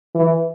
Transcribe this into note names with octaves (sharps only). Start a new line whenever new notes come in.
E3